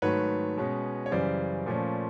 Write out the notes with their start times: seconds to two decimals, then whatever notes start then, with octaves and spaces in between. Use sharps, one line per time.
0.02 G#2 D#3 F#3 A3 B4 C#5
0.57 B2 G#3 C#4
1.06 C#5
1.11 F#2 C#3 E3 G3 C5 D5
1.66 A#2 F3 A3 C#4